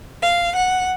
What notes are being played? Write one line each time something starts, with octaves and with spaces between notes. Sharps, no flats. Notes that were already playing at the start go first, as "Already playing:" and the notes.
F5
F#5